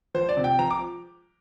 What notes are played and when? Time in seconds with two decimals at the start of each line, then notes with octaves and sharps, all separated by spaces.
0.14 F3 C5
0.29 D5
0.37 C3
0.44 G5
0.59 F3 A#5
0.71 D6